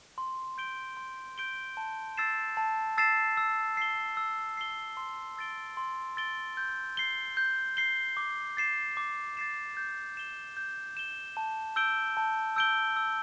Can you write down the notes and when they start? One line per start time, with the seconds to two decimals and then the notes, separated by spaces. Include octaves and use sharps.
0.18 C6
0.58 G6 D7 G7
0.97 C6
1.38 G6 D7 G7
1.77 A5
2.17 E6 A6 C7 E7
2.57 A5
2.98 E6 A6 C7 E7
3.37 E6
3.77 C7 G7
4.17 E6
4.57 C7 G7
4.97 C6
5.37 E6 A6 D7 G7
5.77 C6
6.17 E6 A6 D7 G7
6.57 G6
6.97 C7 G7
7.37 G6
7.77 C7 G7
8.17 D6
8.57 A6 C7 E7
8.97 D6
9.37 A6 C7 E7
9.77 G6
10.17 E7 G7
10.57 G6
10.97 E7 G7
11.37 A5
11.76 E6 G6 D7 G7
12.17 A5
12.56 E6 G6 D7 G7
12.96 E6